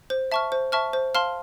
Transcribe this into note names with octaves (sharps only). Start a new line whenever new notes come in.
C5
E5 A5 C#6 F6
C5
E5 A5 C#6 F6
C5
F5 A5 C6 F6